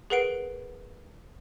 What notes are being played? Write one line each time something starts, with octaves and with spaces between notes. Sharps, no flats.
G#4 A#4 B4 F#5 C7 D7